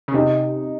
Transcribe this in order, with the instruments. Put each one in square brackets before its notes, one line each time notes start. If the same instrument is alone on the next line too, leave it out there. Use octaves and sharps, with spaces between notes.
[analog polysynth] C#3
[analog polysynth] C3 [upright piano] D#4